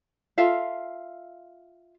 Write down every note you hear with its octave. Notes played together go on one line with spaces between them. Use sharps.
F4 A4 E5 F5